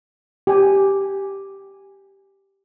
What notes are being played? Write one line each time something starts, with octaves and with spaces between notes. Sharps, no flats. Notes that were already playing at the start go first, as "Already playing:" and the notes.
G4 G#5